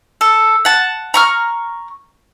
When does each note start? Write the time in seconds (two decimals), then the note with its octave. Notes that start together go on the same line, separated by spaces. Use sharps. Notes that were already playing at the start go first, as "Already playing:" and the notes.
0.21 A4
0.65 F#5 A5
1.14 A#5 C#6 F6